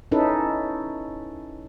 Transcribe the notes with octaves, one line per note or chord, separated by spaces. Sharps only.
C#4 D#4 E4 A4 B4